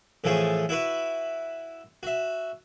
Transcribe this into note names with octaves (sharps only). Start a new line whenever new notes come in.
A2 E3 F3 A3 G#4 C#6
E4 F#4 B4 E5
F#4 E5